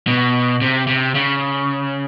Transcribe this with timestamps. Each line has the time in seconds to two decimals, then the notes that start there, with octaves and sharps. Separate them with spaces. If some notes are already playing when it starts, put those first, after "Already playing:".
0.07 B2
0.62 C3
0.87 C3
1.15 C#3